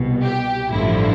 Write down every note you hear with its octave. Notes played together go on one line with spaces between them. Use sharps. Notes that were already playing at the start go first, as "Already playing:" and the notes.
Already playing: C2 B2
G4
A1 G2 D3 F3 E4